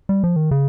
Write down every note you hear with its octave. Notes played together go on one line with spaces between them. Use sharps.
G3
F3
D#3
C#3